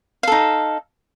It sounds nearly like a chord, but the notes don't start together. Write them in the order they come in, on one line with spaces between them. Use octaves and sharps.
F5 A4 D#4